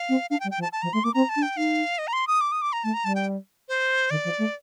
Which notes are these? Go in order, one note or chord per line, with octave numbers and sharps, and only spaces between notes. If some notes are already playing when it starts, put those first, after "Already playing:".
Already playing: F5
C4
D4 F5
G5
G3
G5
F3
A5
A5
F3 A#5
A3 C6
A#3 D6
C4 A#5
A5
D4
G5
D#4 F5
D#5
A#5
C6
D#6
D6
D#6
D6
A#5
A3 A5
A#5
G3 A5
G5
C5
D#3 D5
F3
A3